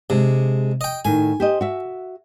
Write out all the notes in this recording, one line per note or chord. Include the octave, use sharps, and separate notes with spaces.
C3 G#3 D4
D#5 G5
A2 D#3 G#5
G4 C5 D#5
F#4 E5